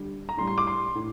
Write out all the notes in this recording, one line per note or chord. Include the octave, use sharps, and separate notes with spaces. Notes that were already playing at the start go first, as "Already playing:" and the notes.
Already playing: D3 G3
A#5
A2 G3 C6
C6
D6
C6
A2